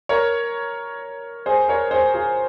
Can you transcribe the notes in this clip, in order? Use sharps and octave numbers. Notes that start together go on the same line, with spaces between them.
A#4 C#5
G#4 C5
A#4 C#5
G#4 C5
F4 G#4